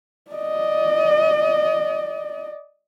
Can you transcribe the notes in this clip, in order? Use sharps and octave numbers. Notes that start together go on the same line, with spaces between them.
D5 D#5